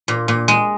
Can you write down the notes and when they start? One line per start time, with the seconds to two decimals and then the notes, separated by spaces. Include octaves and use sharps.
0.08 A#2
0.28 A#2
0.48 G#3